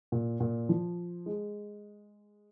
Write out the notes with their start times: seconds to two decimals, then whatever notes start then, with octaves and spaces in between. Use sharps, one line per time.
0.12 A#2
0.40 A#2
0.69 F3
1.26 G#3